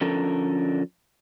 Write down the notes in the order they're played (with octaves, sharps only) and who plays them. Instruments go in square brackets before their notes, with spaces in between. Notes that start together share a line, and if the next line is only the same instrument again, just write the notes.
[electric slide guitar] D3 F3 C#4 A4 A#4